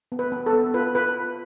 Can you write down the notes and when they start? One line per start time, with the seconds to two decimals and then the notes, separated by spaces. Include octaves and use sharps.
0.12 B3
0.19 B4
0.32 B3
0.46 A4
0.53 B3
0.74 F4 B4
0.95 F4 B4